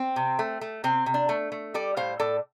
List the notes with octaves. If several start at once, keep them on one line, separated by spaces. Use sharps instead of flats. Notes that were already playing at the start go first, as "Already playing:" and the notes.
Already playing: C4
C3
A3
A3
C3 C4
C3
D4
A3
A3
G3 A4 D5
A2 C5 F5
A2 A4 D5